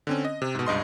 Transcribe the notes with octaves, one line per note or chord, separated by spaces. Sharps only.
D3 C4 C#4
D#5
C3
G#2 B2
C#2 G2 D#5 C6